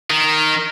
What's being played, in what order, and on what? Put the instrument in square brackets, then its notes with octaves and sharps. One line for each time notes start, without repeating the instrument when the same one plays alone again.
[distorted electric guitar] D#3